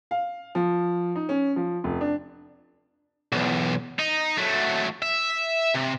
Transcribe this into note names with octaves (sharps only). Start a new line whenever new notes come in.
F5
F3
D#4
C#4
F3
F1
D4
B1 E2
D#4
F#3 A3
E5
C3